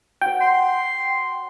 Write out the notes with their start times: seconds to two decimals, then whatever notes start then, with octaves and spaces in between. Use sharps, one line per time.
0.21 F#4 C#5 G5
0.41 C6